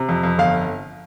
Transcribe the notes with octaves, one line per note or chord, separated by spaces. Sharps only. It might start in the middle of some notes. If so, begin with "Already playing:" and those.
Already playing: C3
F2
F2
G1 F5